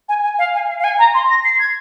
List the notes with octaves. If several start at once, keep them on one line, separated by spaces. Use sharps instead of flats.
G#5
G#5
F5
G#5
F5
F5
G#5
A#5
C6
A#6
C7
G#6